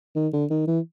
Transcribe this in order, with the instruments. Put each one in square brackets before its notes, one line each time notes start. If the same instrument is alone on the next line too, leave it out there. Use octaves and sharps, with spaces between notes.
[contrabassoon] D#3
D3
D#3
E3